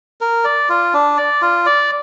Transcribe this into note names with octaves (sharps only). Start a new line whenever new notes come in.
A#4
D5
F4
D4
D5
F4
D5